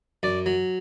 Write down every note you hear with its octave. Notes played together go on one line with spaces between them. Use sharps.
F#2 D5
F#3